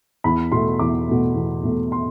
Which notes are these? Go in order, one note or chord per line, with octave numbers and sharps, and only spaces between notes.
E2 B5
B2 A3 C6
E2 D6
B2 A3
E2
B2 A3
C6